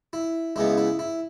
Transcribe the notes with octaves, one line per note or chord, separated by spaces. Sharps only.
E4
C#2 C#3 G#3 B3 E4
E4
E4